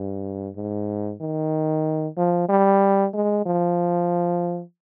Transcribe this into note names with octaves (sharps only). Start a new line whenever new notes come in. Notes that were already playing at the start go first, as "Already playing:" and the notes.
Already playing: G2
G#2
D#3
F3
G3
G#3
F3